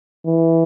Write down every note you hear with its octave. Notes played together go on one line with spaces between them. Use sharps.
E3